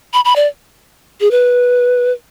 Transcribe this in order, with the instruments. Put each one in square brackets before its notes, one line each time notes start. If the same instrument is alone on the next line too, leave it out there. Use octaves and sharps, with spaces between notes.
[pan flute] B5
B5
D5
G#4
B4